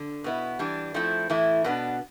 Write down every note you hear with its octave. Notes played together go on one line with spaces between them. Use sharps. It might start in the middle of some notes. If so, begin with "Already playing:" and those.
Already playing: D3
B2 B3 E4
E3 G3 D4
F3 A3 C4 E4
A2 E3 A3 E4
B2 B3 D4